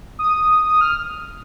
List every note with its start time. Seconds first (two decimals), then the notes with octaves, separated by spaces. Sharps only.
0.19 D#6
0.66 D#6
0.81 F6